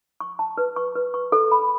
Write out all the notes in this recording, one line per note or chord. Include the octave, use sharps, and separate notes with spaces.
C#6
A5
B4
C#6
B4
C#6
A4
B5